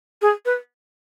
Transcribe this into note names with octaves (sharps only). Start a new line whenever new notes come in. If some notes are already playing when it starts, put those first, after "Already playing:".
G#4
B4